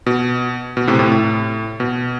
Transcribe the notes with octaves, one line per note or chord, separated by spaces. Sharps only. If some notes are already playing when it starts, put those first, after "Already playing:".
B2
B2
A2 C3
A2 C3
A2
B2